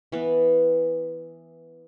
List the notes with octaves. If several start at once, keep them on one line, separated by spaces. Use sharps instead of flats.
E3 B3